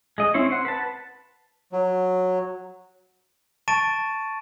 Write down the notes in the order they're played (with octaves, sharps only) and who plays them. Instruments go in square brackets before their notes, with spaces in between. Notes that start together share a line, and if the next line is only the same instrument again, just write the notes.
[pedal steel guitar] G#3 D#5
C4 C#4 E4 C#5
C5 F#5
B4 A5
[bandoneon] F#3
[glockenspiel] A5 C#6 A6 D7 D#7